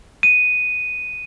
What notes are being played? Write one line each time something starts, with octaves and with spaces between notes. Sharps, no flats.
D#7